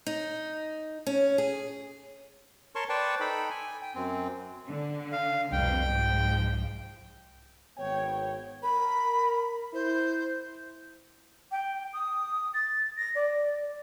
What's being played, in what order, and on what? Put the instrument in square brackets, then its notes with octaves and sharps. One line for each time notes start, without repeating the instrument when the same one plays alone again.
[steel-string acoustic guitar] D#4
C#4
G#4
[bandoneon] A#4 C#5 A5 C6 C#6
B4 C5 D5 G5 A5 C#6
D#4 A4 G5 B5
G#5
G5
F#2 C4
[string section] D3
[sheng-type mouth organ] F5
[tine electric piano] C2 [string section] F2 B2 [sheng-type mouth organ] G5
[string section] G#2 F3
[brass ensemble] G#1 B3 G5 [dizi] C#5
[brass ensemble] A#4 [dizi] B5
[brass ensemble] E4 [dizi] C5
[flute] G5
D#6
A6
A#6
D5